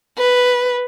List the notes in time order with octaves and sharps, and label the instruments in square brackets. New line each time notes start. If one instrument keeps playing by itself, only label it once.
[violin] B4